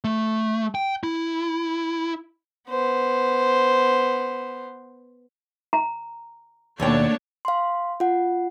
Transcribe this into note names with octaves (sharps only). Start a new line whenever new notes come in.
A3
G5
E4
B3 C5
A#5
D#2 B2 A3 A#3 D4 C#5 D5 G5
F5 C6
F4 F#5